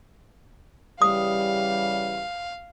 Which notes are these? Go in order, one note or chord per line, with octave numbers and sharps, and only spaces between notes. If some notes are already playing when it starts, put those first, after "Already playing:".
C#3 E3 G3 F5 D#6